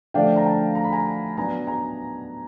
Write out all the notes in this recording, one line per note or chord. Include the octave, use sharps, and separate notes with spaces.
D3 F3 A3 D4 F5 G5
A#5
G5 A5
A#5
B5
G#5 A#5
F#3 B3 D4 G#5 A#5
G#5 A#5